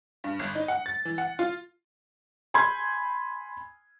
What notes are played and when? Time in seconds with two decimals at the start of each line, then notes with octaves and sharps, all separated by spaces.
0.24 G2
0.39 G1
0.55 D#4
0.68 F#5
0.86 A6
1.05 E3
1.18 F#5
1.39 F4
2.54 G#5 B5 C6 G6 G#6